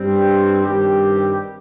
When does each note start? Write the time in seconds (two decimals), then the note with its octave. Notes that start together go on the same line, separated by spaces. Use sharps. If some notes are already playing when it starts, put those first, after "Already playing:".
Already playing: G2 G3 C4
0.63 G2 D#3 G3 C4 G4